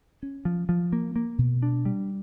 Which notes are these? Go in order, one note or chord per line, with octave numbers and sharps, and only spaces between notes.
C#4
F3
F3
A#3
A#3
B2
D4
G3